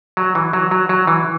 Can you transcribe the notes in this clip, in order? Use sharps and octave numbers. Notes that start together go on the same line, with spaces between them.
F#3
E3
F#3
F#3
F#3
E3